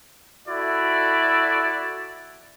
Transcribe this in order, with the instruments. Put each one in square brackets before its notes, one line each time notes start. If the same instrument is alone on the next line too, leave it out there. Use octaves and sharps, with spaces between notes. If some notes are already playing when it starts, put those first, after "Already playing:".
[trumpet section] E4 F#4 A4 D5